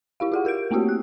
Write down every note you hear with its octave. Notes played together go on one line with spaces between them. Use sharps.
E4 G4 F5
F4 G#4 F#5
G4 A#4 G6 D7
A3 A#3 C4 E4 F#4 G4
F#6